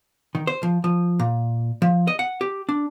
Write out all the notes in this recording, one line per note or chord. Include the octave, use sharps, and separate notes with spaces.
D#3
C5
F3
F3
A#2
F3
D#5
F#5
G4
D4